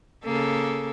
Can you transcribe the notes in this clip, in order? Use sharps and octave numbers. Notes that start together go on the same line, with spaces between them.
C#3 A#3 A4